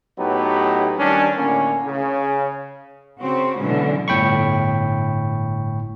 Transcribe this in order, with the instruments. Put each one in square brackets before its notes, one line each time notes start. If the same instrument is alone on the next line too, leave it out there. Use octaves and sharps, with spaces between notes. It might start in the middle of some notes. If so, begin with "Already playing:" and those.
[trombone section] A2 F#3 B3 D#4 G4
D#3 G3 C#4 D4
A2 D3 A#3 C#4
C#3
[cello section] C#3 C4 F#4
B2 D3 E3 F#3 G#3 C#4
[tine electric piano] G1 A2 G5 B5 C#6